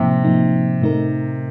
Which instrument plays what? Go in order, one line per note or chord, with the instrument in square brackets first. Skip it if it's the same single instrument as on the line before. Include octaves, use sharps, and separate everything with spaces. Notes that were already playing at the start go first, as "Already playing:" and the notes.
Already playing: [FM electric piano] A2 F3 A#3 D#4 [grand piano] C3
[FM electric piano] A2 F3 A#3 D#4
A2 A3 D#4 A#4